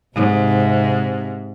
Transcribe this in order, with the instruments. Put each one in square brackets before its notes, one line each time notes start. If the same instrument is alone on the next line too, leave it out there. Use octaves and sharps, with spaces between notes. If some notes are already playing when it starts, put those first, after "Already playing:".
[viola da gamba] G#2 [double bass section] C3